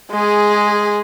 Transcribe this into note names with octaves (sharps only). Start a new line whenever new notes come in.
G#3 G#4